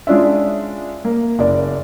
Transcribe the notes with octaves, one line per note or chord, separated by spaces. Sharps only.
G#3 C#4 D4 F4 E5
A#3
F#1 D5